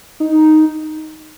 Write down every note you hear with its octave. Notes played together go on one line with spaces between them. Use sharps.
D#4